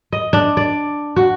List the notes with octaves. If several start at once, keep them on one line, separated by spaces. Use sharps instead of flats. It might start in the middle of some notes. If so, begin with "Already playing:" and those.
D#5
D4
D5
F#4